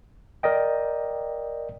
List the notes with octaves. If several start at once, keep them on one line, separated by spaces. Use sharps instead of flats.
A#4 D5 D#5 G5